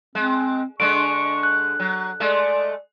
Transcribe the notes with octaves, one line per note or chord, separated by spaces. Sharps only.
G#3 C4
D3 G#3 D4 C#6 D7
F#6
F#3
G#3 A3 D5